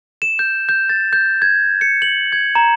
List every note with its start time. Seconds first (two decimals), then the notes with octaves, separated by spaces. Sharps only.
0.22 E7
0.39 G6
0.69 G6
0.90 A6
1.13 G6
1.42 G#6
1.81 C#7
2.02 F#7
2.32 G#6
2.55 A#5